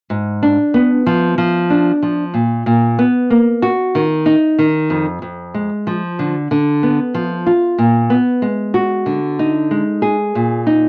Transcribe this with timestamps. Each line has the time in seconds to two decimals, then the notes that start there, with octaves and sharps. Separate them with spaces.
0.10 G#2
0.43 D4
0.74 B3
1.06 F3
1.38 F3
1.70 D4
2.03 F3
2.34 A#2
2.66 A#2
2.99 B3
3.30 A#3
3.62 F#4
3.95 D#3
4.26 D#4
4.59 D#3
4.90 F2
5.22 F2
5.54 G#3
5.87 F3
6.19 D3
6.51 D3
6.83 B3
7.14 F3
7.46 F4
7.78 A#2
8.10 B3
8.42 G#3
8.74 F#4
9.06 D3
9.39 D#4
9.71 G#3
10.02 G#4
10.35 A#2
10.67 D#4